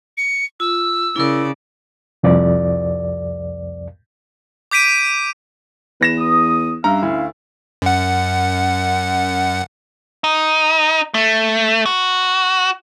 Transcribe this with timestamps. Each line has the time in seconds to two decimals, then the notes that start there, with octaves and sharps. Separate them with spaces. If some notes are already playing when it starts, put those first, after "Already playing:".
0.17 C#7
0.60 F4 E6
1.16 C#3 E4 A#4 D5
2.23 C2 F2 D5
4.71 D6 G6 B6 D7 D#7
6.01 E2 B4 A#6 E7
6.19 D#6
6.84 G2 C#4 E5 F5 A#5
7.03 D2 E4
7.82 F#2 F#5
10.24 D#4
11.14 A3
11.86 F#4